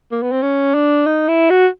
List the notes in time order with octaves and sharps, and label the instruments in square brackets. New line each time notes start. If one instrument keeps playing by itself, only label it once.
[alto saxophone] A#3
B3
C4
C#4
D4
D#4
E4
F#4